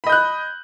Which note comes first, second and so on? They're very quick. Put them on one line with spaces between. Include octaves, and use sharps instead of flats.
B5 D#5 G6 F#6